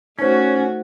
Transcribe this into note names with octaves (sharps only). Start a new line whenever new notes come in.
A3 C#4 D#4 F#4 C5 C#5